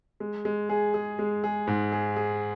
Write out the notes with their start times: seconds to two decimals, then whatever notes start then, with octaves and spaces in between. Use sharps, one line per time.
0.20 G#3
0.45 G#3
0.69 G#4
0.94 G#4
1.19 G#3
1.44 G#4
1.67 G#2
1.92 G#4
2.16 G#4